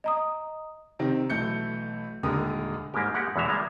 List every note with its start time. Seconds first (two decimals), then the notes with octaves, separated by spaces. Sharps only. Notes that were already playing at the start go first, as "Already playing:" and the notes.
0.04 D#5 A#5 D#6
0.99 C3 D#3 C4
1.30 B1 E3 A3 G6 C#7
2.23 D#1 D3 G#3 G4 A#4 D#6
2.94 G#2 G3 G#3 A#3 G4
3.14 G#3 A#3 G4 A#4 F#5
3.36 E2 B2 E3 G#3 E5 A#5
3.48 G3 G#3 A#3